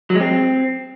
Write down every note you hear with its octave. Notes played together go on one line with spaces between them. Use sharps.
F#3
G#3
C4